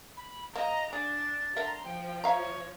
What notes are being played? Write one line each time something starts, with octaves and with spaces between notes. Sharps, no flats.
B5
A#3 D#5 A#5
D4 G#4 A6
D3 A#4 E5 A#5 C6
F3 G5
C#5 E5 F5 A#5